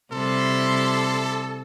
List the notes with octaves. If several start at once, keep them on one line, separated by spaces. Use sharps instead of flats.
C3 G3 E4 A4 C6